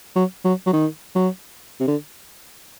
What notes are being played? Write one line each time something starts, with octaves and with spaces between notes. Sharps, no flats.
F#3
F#3
F#3
D#3
F#3
C3
D3